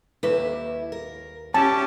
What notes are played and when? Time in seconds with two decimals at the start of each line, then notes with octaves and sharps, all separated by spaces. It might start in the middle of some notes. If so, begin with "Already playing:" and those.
0.23 D#2 E4 B4
0.92 A#4
1.54 C#4 E4 G4 C#5 A5